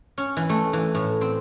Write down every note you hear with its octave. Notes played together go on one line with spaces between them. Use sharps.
C#4
E3
A3
E3
A2
C4